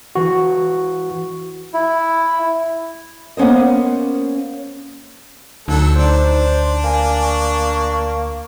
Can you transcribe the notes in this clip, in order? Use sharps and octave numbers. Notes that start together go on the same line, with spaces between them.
E3 F#4
E4
A#3 B3 C#4 C5 D#5
D2 F#3 D#4 A4
D4 C5
A#3 G#5
C#6